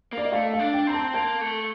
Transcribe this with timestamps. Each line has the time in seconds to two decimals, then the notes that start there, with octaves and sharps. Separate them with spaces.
0.13 A#3 D5
0.25 D#5
0.32 A3 F5
0.53 F5
0.59 D4
0.73 G5
0.87 C4 A#5
0.94 A5
1.14 A#3 A5
1.41 A3